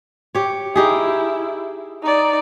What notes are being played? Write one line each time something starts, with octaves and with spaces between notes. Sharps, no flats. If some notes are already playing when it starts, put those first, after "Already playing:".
G4 C#5
D#4 E4 G4 G#4
D#4 D5